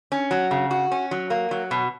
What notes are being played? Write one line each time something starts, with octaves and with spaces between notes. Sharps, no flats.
C#4
F#3
C#3
F#4
C#4
F#3
A#3
F#3
B2